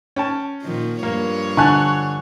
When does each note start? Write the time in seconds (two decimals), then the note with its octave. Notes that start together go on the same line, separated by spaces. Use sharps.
0.16 C#4 G5 A5
0.62 A#2 D#3 F3
1.03 G2 F3 A#3 C#5
1.57 D3 G#5 A5 C#6 F#6